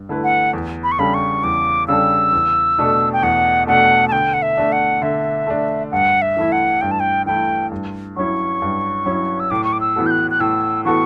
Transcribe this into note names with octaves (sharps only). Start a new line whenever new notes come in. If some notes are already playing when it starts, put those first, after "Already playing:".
Already playing: G2
D3 A3 E4 B4
F#5
E2
B5
C#6
C#3 G3 D4 A4 B5
C#6
E2 D6
C#3 G3 D4 A4 E6
E2
B2 A3 D4 A4
G5
E2 F#5
B2 A3 D4 A4 F#5
A5
D3 G5
F#5
E5
A3 D4
F#5
D3 E5
A3 D4
G2 F#5
E5
E3 A3 E4
F#5
G2 G5
A5
G5
E3 A3 E4 G5
G2
F#3 C#4 E4 C#6
G2
F#3 C#4 E4
E6
A2 D6
C#6
D6
E6
E3 B3 F#4 A4
G6
F#6
F#6
A2 E6
E3 B3 F#4 A4 C#6